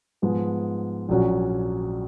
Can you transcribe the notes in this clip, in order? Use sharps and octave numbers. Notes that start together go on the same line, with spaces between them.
G#2 F3 G#3 B3
A#1 A#2 F#3 C#4 F#4